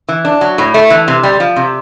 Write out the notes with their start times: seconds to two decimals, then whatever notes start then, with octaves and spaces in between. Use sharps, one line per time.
0.09 E3
0.25 D4
0.41 F#3
0.58 A2
0.74 A3
0.90 E3
1.08 C3
1.23 G3
1.40 F3
1.56 C3